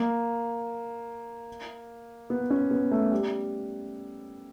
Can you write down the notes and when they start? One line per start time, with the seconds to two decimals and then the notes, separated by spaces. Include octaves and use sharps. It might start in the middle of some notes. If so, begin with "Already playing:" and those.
Already playing: A#3
2.30 B3
2.50 C#4
2.71 B3
2.91 A3
3.11 G3